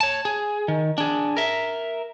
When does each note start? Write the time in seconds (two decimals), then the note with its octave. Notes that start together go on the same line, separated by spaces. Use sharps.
0.01 C#5 A5
0.25 G#4
0.68 D#3
0.98 D4 G#4
1.37 A#4 E5